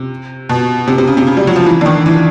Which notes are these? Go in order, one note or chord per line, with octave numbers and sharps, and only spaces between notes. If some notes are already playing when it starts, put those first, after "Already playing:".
Already playing: C3
B2
C3
C3
C#3
C3
C#3
G3
F#3
F3
E3
D3
D#3
E3